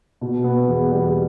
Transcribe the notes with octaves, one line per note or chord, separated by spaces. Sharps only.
B2
B3
E2
G3